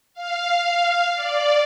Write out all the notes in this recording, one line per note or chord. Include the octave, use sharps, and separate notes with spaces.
F5
D5